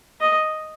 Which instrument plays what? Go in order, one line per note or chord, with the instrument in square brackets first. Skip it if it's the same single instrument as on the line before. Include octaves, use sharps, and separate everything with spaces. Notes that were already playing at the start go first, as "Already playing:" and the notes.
[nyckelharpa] D#5